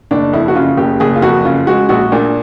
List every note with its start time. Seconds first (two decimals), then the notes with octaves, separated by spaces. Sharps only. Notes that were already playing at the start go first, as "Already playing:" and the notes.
0.11 F#1 D4
0.33 F2 E4
0.48 F#4
0.55 C#3 F4
0.77 F#1 G4
1.00 F#1 G#4
1.16 F4
1.22 F2 F#4
1.45 C#3 F4
1.67 G#3 F#4
1.89 A#1 F#4
2.12 A#2 D4